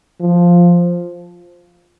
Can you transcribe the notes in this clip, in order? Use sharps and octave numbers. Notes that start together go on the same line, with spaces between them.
F3